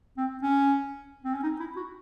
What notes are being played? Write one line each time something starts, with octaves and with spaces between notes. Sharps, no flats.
C4
C#4
C4
C#4
D#4
E4
F#4